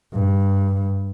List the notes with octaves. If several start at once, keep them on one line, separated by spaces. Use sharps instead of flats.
G2